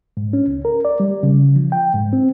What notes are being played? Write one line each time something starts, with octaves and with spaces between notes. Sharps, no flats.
G#2
C#4
C#2
A#4
D5
G3
C#3
F3
G5
G#2
C4